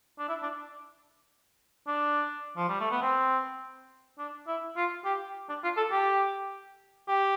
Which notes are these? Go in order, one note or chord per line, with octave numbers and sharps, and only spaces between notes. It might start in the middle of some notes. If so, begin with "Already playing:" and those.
D4
E4
D4
D4
F3
G3
A3
B3
C4
D4
E4
F4
G4
D4
F4
A4
G4
G4